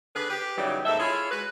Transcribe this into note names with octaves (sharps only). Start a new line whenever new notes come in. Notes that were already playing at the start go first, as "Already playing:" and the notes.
D3 G#4 B4
G4 B4
C#3 E3 F#3 G3 D#4
D#2 G#2 A4 E5
E4 F4 G#4 C#5
G#3 F#4 B4